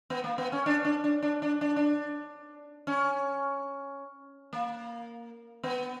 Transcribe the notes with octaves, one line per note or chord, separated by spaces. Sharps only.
B3
A#3
B3
C#4
D4
D4
D4
D4
D4
D4
D4
C#4
A#3
B3